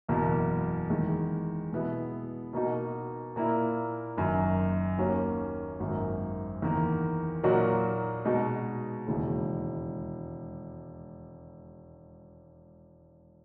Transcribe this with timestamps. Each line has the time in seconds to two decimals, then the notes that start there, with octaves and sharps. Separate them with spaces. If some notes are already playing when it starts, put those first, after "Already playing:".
0.08 F#1 E2 B2 A#3
0.90 E2 D#3 G#3
1.72 B2 G#3 B3 E4 G#4
2.53 B2 A#3 D#4 F#4
3.36 A#2 A#3 E4
4.17 F#1 F#2 D#3
4.98 D#2 D#3 A#3 C#4 F#4
5.80 G#1 F#2 D#3 A#3
6.62 E2 D#3 A#3
7.43 A#2 F#3 A#3 D#4 F#4
8.25 B2 G#3 D#4 F#4
9.07 E1 D#2 C#3 E3 G#3